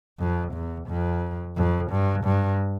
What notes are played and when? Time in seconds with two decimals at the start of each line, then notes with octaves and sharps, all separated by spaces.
0.19 F2
0.53 E2
0.88 F2
1.56 F2
1.91 G2
2.24 G2